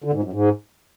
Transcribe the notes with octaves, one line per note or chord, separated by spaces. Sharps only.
D3
G#2
F#2
G#2